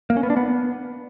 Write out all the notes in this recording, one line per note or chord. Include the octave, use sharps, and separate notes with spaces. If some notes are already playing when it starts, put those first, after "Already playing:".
A#3
C#4
B3
D4
B3